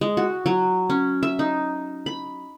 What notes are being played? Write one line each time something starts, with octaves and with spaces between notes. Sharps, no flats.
G#3
F#4
F#3
C#4
E5
D#4
B5